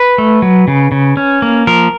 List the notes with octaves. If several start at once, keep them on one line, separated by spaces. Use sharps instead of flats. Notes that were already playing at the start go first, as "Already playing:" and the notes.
Already playing: B4
A3
F#3
C#3
C#3
C#4
A#3
F3 A#4